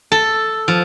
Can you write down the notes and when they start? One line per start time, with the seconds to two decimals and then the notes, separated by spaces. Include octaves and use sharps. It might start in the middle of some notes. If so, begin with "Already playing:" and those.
0.12 A4
0.68 F3